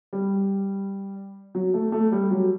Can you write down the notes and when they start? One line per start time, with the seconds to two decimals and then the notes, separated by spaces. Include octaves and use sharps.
0.13 G3
1.55 F#3
1.74 A3
1.92 A3
2.12 G3
2.31 F#3